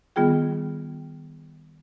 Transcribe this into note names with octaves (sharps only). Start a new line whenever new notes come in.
D#3 G3 B3 F4 G#4 G5